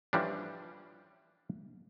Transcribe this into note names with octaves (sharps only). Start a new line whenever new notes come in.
E3 F3 G3 C#4 D4